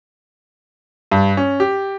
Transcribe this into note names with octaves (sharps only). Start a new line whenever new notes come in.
G2
C#4
G4